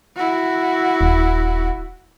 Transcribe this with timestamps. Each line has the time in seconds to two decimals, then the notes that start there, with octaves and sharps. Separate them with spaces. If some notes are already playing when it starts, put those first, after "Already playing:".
0.16 E4 F#4
1.01 D#1